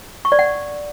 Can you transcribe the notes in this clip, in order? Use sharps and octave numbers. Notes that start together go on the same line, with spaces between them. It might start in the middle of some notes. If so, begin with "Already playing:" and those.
C#6
D5
F#5